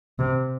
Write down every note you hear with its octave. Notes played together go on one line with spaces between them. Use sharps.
C3